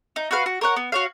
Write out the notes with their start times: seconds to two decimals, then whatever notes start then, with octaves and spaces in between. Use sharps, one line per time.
0.16 D#4
0.31 F#4 B4 F5
0.46 F#4
0.61 A#4 C#5 F#5
0.76 B3
0.92 F#4 C#5 F5